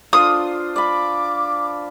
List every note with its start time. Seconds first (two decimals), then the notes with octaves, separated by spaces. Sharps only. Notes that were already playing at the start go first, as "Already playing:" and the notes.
0.13 D4 F4 C5 D#6
0.76 D5 B5 D6